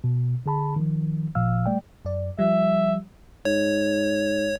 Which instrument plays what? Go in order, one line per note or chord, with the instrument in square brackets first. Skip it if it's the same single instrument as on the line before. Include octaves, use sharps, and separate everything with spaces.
[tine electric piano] B2
D3 G#4 A5 B5
D#3 F3
G1 A#2 F3 F5 E6 F6
G3 A3 D5 G5
[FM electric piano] F#2 D5
[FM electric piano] F3 G3 [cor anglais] E5
[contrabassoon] G#2 [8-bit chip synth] C#5